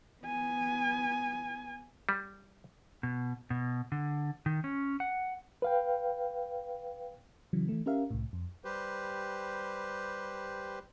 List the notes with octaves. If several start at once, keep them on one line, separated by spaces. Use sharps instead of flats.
B3 G#5
G3
B2
B2
D3
D#3
C#4
F#5
B4 F5 G5
C#3 E3 F#3
E3 A3
C#4 G4 A#4 E5 F5
C2 A2
F2
G3 G4 B4 C5